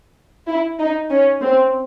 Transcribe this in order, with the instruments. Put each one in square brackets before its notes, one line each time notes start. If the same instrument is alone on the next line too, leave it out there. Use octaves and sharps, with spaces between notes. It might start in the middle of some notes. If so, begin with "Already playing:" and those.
[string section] E4
D#4
C#4
C4